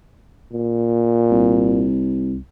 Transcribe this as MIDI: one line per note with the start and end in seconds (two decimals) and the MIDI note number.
0.52 1.87 46
1.31 2.37 36